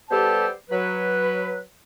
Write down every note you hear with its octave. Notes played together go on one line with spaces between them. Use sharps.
G3 B3 G4 A4 C5 A5
F#3 B4